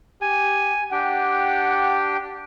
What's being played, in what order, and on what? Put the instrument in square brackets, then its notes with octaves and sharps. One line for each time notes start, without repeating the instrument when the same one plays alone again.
[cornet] G4 [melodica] G#5
[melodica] D4 G4 G5 [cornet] F#5